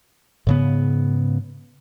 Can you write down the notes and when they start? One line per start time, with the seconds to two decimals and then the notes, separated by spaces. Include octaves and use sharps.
0.47 G#2 C#3 B3